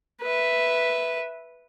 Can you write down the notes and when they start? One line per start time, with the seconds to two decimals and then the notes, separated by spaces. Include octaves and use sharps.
0.22 B4 E5